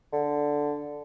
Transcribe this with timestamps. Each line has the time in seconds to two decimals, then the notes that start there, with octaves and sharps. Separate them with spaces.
0.12 D3